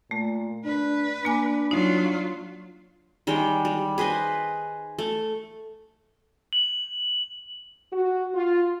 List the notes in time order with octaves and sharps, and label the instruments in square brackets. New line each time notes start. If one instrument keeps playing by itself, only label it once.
[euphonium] A#2 [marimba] A3
[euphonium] D4 [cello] B4
[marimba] A#3 G#5 D6 [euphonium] D4
[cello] F#3 F4 [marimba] D#4
[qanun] D#3 G3 G#3 G5
G3
G#4 B4 C5 D#5
A3
[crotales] F#7
[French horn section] F#4
F4